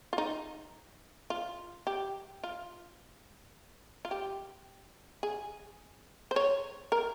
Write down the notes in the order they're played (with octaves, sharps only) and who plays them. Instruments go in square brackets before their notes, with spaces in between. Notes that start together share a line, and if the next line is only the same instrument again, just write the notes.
[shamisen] F4
D#4
F4
G4
F4
F4
G4
G#4
C5
C#5
A#4